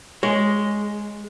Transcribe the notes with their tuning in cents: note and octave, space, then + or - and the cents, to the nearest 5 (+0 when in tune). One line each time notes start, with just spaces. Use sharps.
G#3 +0 C#5 +0